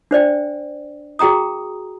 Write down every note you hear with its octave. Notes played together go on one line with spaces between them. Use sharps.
D4 C5 D5 G5
F#4 G#4 G5 A#5 D#6